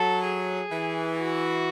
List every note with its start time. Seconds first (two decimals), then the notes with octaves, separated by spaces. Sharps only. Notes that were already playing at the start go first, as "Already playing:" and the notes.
Already playing: F#3 A4
0.23 G#4
0.71 E3
1.18 F#4